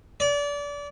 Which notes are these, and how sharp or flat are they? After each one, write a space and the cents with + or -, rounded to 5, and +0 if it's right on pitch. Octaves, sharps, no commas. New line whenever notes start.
D5 -30